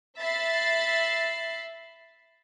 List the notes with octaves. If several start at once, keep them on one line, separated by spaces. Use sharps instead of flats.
E5 B5 A6 C7